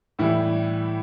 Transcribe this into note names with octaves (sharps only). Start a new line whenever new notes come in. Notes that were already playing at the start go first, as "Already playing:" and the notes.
A2 E3 G3 E4